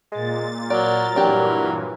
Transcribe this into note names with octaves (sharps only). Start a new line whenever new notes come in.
A#2 G#3 A6
F#3 A#4 D5
G2 A#2 E3 F#3 D4 G4